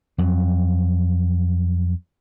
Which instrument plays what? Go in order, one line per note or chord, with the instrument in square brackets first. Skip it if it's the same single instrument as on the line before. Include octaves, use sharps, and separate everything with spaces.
[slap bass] F2 F#3